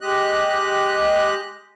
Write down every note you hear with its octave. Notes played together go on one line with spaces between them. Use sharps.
G#3 G4 D#5 F#6